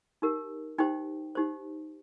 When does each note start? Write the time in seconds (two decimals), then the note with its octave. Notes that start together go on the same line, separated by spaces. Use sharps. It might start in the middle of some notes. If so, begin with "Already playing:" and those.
0.22 D#4 G4 A#4
0.78 D#4 G4 C5 G5
1.35 D#4 G4 C5